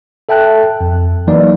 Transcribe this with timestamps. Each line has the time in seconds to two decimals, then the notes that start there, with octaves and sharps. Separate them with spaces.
0.29 A4 E5 G5 A5 F#6
0.81 F2
1.27 E3 F#3 A#3 D#4 D5